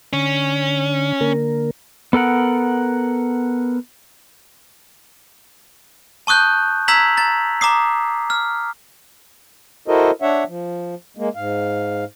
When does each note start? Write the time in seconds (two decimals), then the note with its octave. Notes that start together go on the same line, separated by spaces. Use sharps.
0.13 D3 C#4
1.21 D3 A#3 A#4
2.13 B3 A4 A#4 F#5
6.27 A5 C#6 D#6 F#6 G6
6.88 A#5 E6 G#6 B6 F7 F#7
7.17 A#5 A6
7.61 A#5 D6 D#6 C7
8.30 F6
9.88 E4 F#4 A4 A#4 C5 D#5
10.22 D4 C#5 E5 F#5
10.47 F3
11.17 G#3 A#3
11.35 G#2 F5